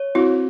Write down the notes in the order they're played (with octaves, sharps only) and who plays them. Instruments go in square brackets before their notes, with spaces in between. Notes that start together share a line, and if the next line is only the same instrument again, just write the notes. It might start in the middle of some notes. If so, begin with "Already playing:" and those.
Already playing: [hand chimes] C#5
[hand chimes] C4 [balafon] E4 F#4